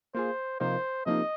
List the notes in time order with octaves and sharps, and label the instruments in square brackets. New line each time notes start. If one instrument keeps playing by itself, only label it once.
[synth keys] A#3 F4 G#4 [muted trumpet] C5
[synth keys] C3 F3 A#3 D#4 [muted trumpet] C5
[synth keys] C3 F3 A#3 D#4 [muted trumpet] D#5